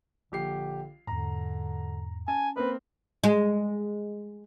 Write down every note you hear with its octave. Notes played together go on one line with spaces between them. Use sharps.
A#1 D3 G4 C7
E2 G#2 D3 A#5
C#4 G#5 A5
A#3 C4 B4
G#3